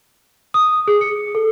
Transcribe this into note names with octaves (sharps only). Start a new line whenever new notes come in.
D#6
G#4
C#7
A4